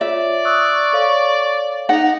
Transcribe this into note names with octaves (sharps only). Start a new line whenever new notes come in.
F4 C#5 D5 E5
C#6 D#6 E6 F#6
A4 C#5 F5
D#4 F#5 A#6 F7